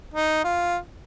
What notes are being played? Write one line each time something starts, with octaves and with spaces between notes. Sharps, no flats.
D#4
F4